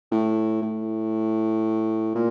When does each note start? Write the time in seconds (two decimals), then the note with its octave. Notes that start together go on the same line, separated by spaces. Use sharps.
0.12 A2
0.62 A2
2.15 A#2